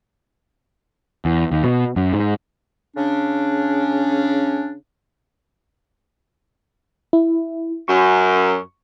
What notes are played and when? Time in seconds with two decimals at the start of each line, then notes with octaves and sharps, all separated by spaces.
1.25 E2
1.52 D#2
1.64 B2
1.96 F#2
2.13 G#2
2.96 C#3 C#4 D4
7.13 E4
7.88 F#2 C#6